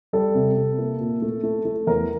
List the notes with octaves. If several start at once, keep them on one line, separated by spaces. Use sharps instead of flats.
G3 A4
C3
C3
A#3
A#2
A3
A3
A3
E2 A#4